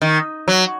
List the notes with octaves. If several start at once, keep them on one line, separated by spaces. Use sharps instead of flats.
D#3
F#3